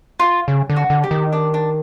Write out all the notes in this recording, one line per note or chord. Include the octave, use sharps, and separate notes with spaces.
F4
C#3
D3
F#4
D3
G4
D#3
D4
D4